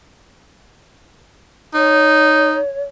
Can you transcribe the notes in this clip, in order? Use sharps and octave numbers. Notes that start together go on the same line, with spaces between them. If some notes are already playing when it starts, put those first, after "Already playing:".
D#4 C#5